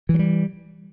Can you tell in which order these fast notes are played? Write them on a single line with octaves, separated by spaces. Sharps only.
E3 F#3 G3